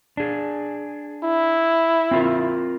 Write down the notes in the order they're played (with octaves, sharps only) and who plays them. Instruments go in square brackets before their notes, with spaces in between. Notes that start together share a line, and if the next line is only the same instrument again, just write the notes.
[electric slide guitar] D4 G#4
[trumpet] E4
[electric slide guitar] C4 F4 A#4